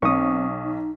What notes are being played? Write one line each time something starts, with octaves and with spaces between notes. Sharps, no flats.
B1 C4 C#6 D#6
D#4